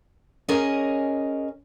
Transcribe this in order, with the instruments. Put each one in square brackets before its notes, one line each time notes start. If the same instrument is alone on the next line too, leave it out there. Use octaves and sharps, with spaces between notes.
[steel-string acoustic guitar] C#4 G#4 A#4 D#5 G#5